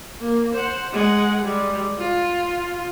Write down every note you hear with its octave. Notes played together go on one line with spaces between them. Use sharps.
A#3
C5 F#5
G#3 F#5
G3 G#3
F4